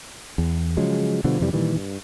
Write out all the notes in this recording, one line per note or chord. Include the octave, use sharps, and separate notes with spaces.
E2
C#3 F3 F#3 G#3
B2 D3 F3 G3
F2 C3 E3 G3
A#2 D#3 E3 G3
G2